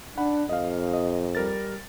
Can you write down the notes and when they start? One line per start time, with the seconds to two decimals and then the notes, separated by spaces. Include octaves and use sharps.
0.17 D4 F#5 B5
0.49 F2 D#5 F5
0.93 D#5
1.35 G3 A#4 A6